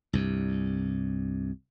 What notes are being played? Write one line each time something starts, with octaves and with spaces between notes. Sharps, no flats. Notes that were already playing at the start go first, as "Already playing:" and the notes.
C2 G2